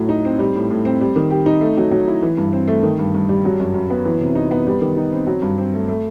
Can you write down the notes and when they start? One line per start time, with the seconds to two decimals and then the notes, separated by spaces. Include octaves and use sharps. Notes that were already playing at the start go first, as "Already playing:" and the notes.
Already playing: A2 F#3
0.09 D#4
0.25 C4
0.39 G3
0.55 A2
0.70 A2
0.85 C4
1.01 G3
1.16 D#3
1.31 G4
1.46 D#4
1.61 A3
1.77 F#3
1.91 F#3
2.08 E4
2.23 E3
2.37 G2
2.53 C4
2.68 A3
2.83 D#3
2.99 G2
3.15 G2
3.29 G3
3.45 F#3
3.60 F#2
3.74 F#2
3.90 B3
4.05 E3
4.21 C3
4.35 D#4
4.51 B3
4.67 G3
4.81 D#3
4.97 D#4
5.13 C4
5.27 F#3
5.42 G2
5.58 C4
5.74 A3
5.88 A3